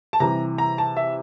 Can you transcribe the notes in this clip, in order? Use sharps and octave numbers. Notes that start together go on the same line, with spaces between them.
A5
C3 E3 G3 A#5
A#5
A5
E5